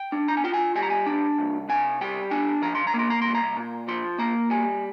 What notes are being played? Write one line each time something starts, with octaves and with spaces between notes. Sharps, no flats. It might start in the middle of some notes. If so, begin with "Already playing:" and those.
Already playing: G5
D4
A#5
G#5
F4 G5
G#5
G3 G#5
A#5
G#5
D4
C2
C3 G#5
G3 G5
D4 G#5
F3 A#5
C6
A#5
A#3
C6
A#5
C2 C6
A#5
A#2
F3 C6
A#3 A#5
G3 G#5